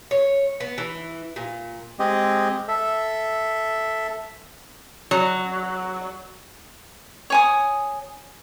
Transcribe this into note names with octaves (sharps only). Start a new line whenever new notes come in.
C#5
B3
E3
A#2
G#3 C4 G4 G#4 D#5
A4 E5
F#3
C#5 G#5 D#6